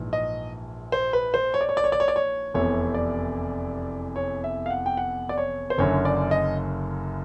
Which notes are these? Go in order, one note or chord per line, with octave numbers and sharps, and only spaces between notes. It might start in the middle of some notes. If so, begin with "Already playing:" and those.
Already playing: A#1 G#2 E3
D#5
C5
B4
C5
C#5
D5
C#5
D5
C#5
D5
C#5
D5
C#5
F1 E2 C3 C#5
D5
C#5
E5
F5
F#5
G5
F#5
D5
C#5
C5
F#1 F#2 D3 C#5
D5
D#5